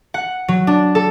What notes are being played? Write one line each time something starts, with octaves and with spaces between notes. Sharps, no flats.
F#5
F#3
D4
A4